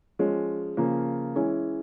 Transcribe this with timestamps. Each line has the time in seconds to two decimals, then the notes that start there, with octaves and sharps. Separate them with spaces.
0.19 F3 G#3 C#4
0.77 C#3 F3 A#3
1.35 E3 G#3 C#4 E4